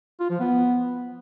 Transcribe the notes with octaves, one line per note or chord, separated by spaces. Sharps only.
F4
F3
B3